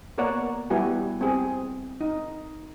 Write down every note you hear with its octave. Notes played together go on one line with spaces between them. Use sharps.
A#3 B3 A#4 C#5 D5 F#5
G3 B3 E4 F#4 G4 G#5
C4 G4 G#4
D#4